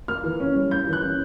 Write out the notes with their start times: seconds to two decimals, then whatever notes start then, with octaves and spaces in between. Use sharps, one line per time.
0.08 A#3 F6
0.23 E3
0.40 C#4
0.55 G3
0.71 A#3 G6
0.87 E3
0.93 F#6
1.03 C#4